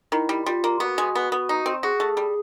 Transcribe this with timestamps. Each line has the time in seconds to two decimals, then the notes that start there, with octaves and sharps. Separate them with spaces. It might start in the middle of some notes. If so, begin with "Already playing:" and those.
0.12 D#3 E4
0.29 G3
0.46 G3 F4
0.64 A#3
0.80 B3 F#4
0.98 G#3
1.15 B3
1.32 B3
1.49 D#4
1.66 C4
1.83 F#4 G#4
2.00 A3
2.17 G3